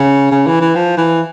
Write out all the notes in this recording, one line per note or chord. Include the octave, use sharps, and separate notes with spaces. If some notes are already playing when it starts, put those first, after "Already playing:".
Already playing: C#3
C#3
E3
E3
F3
E3